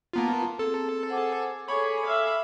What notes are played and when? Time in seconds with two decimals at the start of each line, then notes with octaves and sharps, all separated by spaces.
0.13 A#3 B3 F4 A5 A#5 C6
0.59 C4 G#4 A4
1.08 G#4 C5 F#5 D6
1.68 G#4 A4 C#5 G#5 B5 D6
2.06 E5 F5